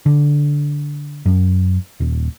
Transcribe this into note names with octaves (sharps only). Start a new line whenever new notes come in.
D3
F#2
D#1